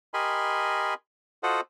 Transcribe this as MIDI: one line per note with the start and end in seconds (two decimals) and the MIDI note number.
0.14 0.94 67
0.14 0.94 70
0.14 0.94 75
0.14 0.94 80
0.14 0.94 83
0.14 0.94 84
1.43 1.61 65
1.43 1.61 66
1.43 1.61 69
1.43 1.61 72
1.43 1.61 75
1.43 1.61 78